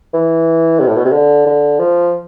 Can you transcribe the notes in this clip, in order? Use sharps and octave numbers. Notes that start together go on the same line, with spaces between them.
E3
C3
A2
B2
C3
D3
D3
F3